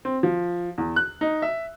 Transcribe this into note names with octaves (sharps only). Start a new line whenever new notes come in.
C4
F3
E2
F#6
D#4
E5